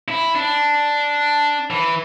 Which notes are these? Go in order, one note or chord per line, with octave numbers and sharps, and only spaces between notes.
E4
D4
E3